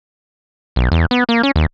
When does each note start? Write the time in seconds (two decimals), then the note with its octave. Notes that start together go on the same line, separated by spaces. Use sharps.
0.76 B1
0.92 E2
1.11 B3
1.29 A#3
1.43 C#4
1.56 D#2